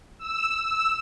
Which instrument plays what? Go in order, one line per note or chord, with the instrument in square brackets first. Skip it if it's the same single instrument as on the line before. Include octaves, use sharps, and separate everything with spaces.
[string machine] E6